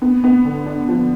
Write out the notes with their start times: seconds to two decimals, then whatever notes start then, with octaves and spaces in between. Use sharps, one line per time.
0.02 B3
0.24 B3
0.45 D3
0.66 D4
0.88 F3